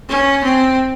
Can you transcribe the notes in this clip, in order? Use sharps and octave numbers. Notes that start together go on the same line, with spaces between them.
C#4
C4